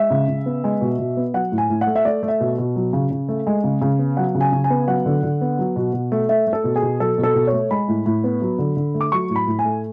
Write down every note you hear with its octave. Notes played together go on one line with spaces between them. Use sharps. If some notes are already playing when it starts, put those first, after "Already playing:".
Already playing: G#3 E5
C#3
C#3
B3
G#3
B2
B2
B3
F#3 F#5
A2
G#5
A2
F#5
A3
E5
A3 D5
A3
E5
B2
B2
F#3
C#3
C#3
A3
G#3
C#3
C#3
B3
F#3 F#5
C#3
G#5
C#3
G#5
B3
F#3 F#5
D3
D3
B3
F#3
B2
B2
A3
A3 E5
A3
A4
B2
G#4
B2
F#3 A4
B2
A4
B2
C#5
A3
G#3 B5
A2
A2
B3
F#3
D3
D3
A3
D6
F#3 C#6
A2
B5
A2
G#5
A3